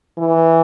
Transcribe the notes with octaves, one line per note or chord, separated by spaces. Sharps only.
E3